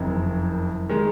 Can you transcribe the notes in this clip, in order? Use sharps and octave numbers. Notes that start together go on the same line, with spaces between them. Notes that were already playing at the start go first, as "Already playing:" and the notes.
Already playing: F#1 F2 D#3
D#3 G#3